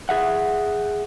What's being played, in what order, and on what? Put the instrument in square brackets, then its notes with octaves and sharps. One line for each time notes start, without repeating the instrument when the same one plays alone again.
[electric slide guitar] G#4 E5 F#5